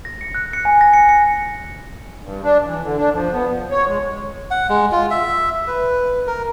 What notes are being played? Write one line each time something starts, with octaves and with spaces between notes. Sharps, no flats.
A#6
C#7
F#6
C#7
G#5
A#6
C#7
C#7
G2
D4
E3
D3
D4
F3
B3
F3
C#5
G#3
F#5
G#3
F4
E5
B4
A#4